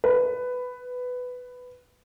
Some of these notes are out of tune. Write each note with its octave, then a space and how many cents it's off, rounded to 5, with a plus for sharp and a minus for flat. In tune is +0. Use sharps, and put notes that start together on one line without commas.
B4 +10